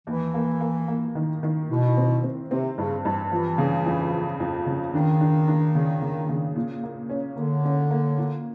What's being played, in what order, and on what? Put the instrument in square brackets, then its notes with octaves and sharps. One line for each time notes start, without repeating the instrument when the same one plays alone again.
[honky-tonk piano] D#2 [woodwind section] E3
[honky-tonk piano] A#3
A#3
A#3
D#3
D#3
[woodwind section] B2 [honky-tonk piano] E3
[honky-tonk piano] C4
C4
[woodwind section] C3 [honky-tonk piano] C4
[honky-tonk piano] G2 [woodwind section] C#3
[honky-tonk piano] G2 [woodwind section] E3
[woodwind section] E3 [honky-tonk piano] F3
[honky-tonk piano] C#3
F2
F3
F2
C#3
[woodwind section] D#3 [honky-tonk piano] D4
[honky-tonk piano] D4
D4
C#3
C#3
C#3
A#2
A#3
C#4
[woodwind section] D3 [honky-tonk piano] A#3
[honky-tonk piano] C#4
A#3
A#2